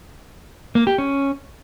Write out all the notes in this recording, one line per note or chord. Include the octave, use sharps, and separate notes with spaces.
A#3
G4
C#4